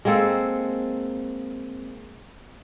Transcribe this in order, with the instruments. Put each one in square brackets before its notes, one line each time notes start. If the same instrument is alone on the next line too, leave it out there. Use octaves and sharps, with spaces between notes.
[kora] G#3 A#3 C4 A4